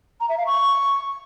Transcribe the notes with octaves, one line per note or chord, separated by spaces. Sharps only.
A#5
E5
F5
C#6